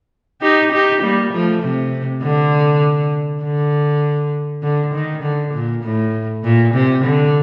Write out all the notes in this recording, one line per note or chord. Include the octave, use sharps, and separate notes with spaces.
D#4 G4
D#4 G4
G3 A#3
F3 A3
C3
D3
D3
D3
D#3
D3
A#2
A2
A#2
C3
D3